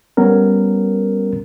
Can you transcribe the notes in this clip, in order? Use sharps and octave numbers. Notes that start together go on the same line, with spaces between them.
G3 B3 C#4 A#4